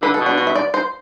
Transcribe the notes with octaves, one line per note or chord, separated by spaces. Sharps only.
D3 B4
A4
B2
D4
F#4
E5
D5
C5